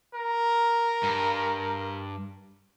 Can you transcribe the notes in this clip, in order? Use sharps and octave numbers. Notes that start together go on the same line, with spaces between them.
A#4
G2